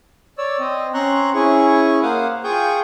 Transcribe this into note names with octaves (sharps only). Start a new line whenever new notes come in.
C#5 D5 E6
C4 D#5
C4 C#4 A#5 C6 C#6 F#6
C#4 E4 G#4 C#6
A#3 C5 F5 F#5 D#6
F4 G#4 G5 C#6 D#6 G6